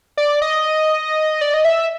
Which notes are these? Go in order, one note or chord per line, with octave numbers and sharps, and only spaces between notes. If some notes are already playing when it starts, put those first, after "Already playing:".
D5
D#5
D5
D#5
E5